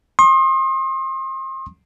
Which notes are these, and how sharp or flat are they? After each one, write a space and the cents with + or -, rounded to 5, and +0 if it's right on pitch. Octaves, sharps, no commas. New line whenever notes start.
C6 +35 D#6 -15